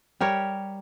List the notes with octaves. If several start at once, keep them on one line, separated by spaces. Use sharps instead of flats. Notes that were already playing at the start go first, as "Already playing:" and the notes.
G3 G4 A#4 C#5